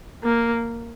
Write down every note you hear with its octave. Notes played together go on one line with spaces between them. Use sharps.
A#3